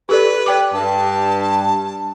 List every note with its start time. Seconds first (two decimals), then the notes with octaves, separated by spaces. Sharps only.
0.09 G4 A4 B4 D5
0.46 D5 G5 D6
0.73 G2 A5